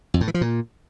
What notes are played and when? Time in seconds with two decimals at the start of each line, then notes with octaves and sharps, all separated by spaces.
0.14 F2
0.21 A2
0.28 E3
0.34 F3
0.41 A#2